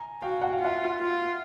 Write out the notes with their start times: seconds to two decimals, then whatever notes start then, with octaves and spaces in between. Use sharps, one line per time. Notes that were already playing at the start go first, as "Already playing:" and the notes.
Already playing: G#5 A#5
0.22 F#4 F5 G5
0.42 F#5
0.53 F5
0.61 F4 E5 F#5
1.00 F4